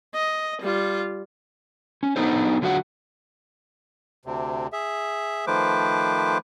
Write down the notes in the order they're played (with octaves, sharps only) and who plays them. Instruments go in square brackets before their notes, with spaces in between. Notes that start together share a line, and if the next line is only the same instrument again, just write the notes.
[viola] D#5
G3 F4
[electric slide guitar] C#4
B3 D4 D#4 A4 C5
D3 F#3 F4 F#4 A4 F#5
[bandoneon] D2 C3
G#4 E5
D#3 F3 A3 B4 C5 D6